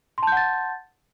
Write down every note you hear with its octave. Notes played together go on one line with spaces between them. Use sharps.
F#5 A5 C6 G6 A6